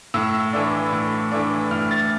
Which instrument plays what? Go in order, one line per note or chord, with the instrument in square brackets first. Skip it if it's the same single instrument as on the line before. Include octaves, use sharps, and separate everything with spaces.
[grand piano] A2 E6
E3 A3 D4
A2
E3 A3 D4
A2 F6
A6